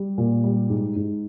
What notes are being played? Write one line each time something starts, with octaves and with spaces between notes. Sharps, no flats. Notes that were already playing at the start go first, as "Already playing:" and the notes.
Already playing: G3
A#2
G3
G#2
G#2